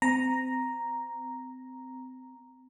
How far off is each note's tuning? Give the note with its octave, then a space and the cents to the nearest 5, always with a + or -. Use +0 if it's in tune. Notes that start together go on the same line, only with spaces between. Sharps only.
C4 -30 A#5 +0